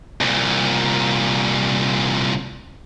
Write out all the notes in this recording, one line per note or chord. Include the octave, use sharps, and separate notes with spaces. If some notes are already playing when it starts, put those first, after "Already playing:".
C2 A#2